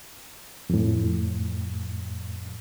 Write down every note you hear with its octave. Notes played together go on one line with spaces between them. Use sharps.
F2 A2